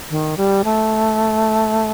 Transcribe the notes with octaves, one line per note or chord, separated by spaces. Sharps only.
D#3
G3
A3